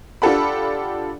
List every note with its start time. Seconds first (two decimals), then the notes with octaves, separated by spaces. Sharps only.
0.22 D4 F4 G4 A4 F#5 B5